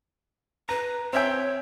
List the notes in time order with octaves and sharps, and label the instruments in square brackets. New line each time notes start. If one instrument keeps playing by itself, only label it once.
[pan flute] B4 [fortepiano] A#5
[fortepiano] C4 E5 G5 [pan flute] C#5